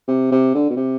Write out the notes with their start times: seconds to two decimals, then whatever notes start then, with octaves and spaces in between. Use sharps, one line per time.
0.08 C3
0.31 C3
0.54 D3
0.70 B2
0.76 C3